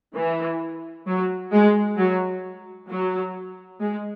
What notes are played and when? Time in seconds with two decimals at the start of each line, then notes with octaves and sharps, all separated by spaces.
0.16 E3
1.07 F#3
1.52 G#3
1.97 F#3
2.90 F#3
3.81 G#3